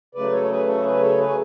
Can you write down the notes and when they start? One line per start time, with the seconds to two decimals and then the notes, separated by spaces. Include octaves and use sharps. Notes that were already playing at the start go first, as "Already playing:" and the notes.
0.15 C#3 F#3 A3 B4 D5
0.32 A4 C#5
0.43 C#5
0.49 G#4 B4
0.67 F#4 A4
0.84 G#4 B4
1.01 A4 C#5
1.19 G#4 B4